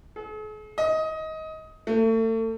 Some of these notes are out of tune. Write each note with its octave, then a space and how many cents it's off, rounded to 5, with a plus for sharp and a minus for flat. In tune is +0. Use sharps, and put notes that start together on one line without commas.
G#4 +45
D#5 +20
A3 +35